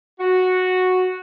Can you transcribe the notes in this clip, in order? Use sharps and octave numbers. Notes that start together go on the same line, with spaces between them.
F#4